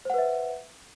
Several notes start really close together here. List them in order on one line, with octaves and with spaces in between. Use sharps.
C5 F#5 B4 E5